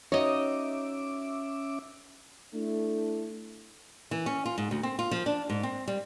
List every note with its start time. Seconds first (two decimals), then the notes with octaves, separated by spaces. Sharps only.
0.12 C#4 D#4 F#4 C#5 D#5 E5 D6
2.54 A3 D4 E4
4.11 E3
4.26 C#4
4.46 F4
4.58 G#2
4.71 D2
4.83 C4
4.99 F4
5.11 F3
5.26 D4
5.50 G#2
5.63 C4
5.88 G3